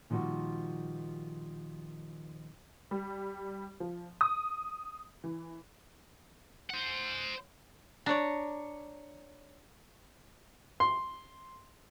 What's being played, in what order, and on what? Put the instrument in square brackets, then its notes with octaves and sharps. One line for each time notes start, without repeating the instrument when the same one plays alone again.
[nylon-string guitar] A#2 D#3 F3 G3 F#4
[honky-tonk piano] G3
F3
D#6
E3
[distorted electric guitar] C5 F#5
[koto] D4 D5 [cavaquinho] C#5 A#5
[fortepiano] C6